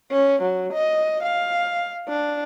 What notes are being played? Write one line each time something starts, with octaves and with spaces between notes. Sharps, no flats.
C#4
F#3
D#5
F5
D4